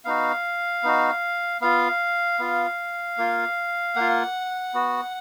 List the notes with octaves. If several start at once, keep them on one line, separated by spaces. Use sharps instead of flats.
B3 D#4 F#4 F5
B3 D#4 F#4
B3 F4 F5
B3 F4
A#3 F4
A#3 F4 F#5
B3 F#4